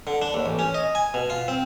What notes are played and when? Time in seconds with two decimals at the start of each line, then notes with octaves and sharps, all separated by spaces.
0.07 D3
0.22 D4
0.34 D#2
0.46 A1
0.59 C#4
0.74 D#5
0.95 G#5
1.14 B2
1.30 F4
1.48 C4